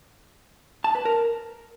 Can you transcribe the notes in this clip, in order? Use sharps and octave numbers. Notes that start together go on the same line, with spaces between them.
A5
B4
A#4